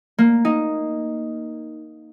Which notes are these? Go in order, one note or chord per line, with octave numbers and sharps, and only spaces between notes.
A#3
D#4